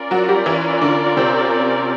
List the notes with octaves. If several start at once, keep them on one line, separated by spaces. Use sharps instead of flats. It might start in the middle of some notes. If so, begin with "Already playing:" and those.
Already playing: C#4 F4 A#4 D5
F#3 F#4
G3 G4
E3 E4
D3 D4
C3 C4